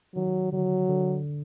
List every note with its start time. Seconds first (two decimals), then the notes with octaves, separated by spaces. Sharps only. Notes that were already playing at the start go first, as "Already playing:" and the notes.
0.15 D#3 F#3
0.53 D3 F#3
0.89 D3